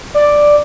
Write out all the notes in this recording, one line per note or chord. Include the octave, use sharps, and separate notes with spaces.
D5